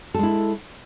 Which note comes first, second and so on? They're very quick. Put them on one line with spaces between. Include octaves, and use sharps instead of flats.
A4 G#3 E4